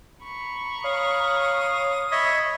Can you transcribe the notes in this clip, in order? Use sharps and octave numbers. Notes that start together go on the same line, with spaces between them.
A#5 B5 C#6
C#5 F5 D#6
C#5 D#5 E5 B5